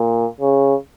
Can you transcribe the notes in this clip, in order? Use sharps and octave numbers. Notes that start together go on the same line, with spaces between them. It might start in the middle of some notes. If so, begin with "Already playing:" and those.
Already playing: A#2
C#3